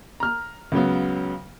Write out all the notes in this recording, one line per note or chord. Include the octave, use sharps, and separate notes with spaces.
A#5 F6
C#2 C#3 F#3 B3